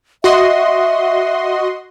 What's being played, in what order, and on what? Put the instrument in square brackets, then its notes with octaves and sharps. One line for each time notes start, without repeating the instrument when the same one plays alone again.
[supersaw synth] F#4 D#5 C6 [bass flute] E5